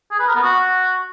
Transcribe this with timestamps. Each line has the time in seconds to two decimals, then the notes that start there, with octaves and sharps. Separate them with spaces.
0.11 G#4
0.19 B4
0.27 A#4
0.35 B3
0.43 F#4